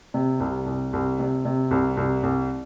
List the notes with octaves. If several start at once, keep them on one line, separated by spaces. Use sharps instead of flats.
C3
C2
C2
C2
C3
C3
C2
C2
C2